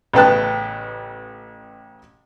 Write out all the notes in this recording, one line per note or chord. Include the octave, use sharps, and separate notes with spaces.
A1 C#3 B3 G5 A5 F#6